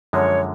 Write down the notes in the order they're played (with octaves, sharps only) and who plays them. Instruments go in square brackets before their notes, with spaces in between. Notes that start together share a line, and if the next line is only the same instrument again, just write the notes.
[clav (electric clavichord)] F#2 D3 F3 G#3 [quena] C#5